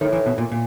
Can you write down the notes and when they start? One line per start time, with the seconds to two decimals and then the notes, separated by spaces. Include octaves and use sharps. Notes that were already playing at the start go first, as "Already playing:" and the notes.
0.01 A2 D#3
0.13 E3
0.26 B2
0.38 A#2
0.52 A#2